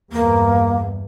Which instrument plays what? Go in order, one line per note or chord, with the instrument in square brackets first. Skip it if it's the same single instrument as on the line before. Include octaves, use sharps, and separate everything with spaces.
[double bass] E2 G2 [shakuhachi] A#3